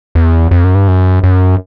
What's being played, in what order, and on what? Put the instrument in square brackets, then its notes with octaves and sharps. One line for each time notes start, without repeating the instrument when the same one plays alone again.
[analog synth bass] E2
F2
F#2
G2
F#2
F#2